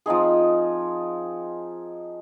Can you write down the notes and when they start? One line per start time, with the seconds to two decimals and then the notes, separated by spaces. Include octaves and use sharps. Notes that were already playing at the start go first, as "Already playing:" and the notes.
0.06 F3 C4 D#4 G#4